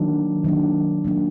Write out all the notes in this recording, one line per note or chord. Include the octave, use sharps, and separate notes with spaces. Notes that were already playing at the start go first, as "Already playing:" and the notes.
Already playing: D#3 F#3 A#3 D4
D#3 F#3 A#3 D4
D#3 F#3 A#3 D4